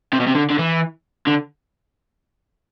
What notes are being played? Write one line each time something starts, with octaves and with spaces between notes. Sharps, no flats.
C3
B2
C3
D3
D3
E3
D3